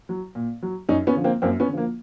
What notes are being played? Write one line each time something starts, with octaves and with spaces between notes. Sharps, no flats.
F#3
A#2
F#3
F#2 C#4 D#4
B3 C#4
D3 F3
A#3 C4
F#2 A#3 C4
B3 C#4
D3
F3 A#3